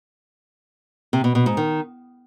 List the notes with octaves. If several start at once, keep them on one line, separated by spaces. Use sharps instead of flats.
C3
B2
B2
G#2
D#3